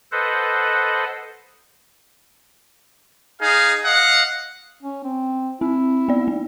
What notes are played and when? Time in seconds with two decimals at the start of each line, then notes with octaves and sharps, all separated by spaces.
0.12 A4 B4 C5 D#5 F#5
3.41 D#4 G#4 F5
3.85 D#5 F5 F#5
4.83 C#4
5.04 C4
5.61 C4 E4
6.08 B3 D5
6.28 B3